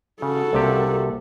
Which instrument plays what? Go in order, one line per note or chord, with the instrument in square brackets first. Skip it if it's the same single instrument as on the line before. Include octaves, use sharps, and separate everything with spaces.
[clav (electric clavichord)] C#3 [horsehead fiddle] F#4 A4
[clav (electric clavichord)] C2 C3 G4 [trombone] A#3